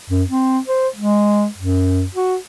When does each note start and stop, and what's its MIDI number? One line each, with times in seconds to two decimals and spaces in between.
0.10 0.23 42
0.29 0.59 60
0.68 0.88 72
0.96 1.46 56
1.58 2.04 42
2.15 2.36 66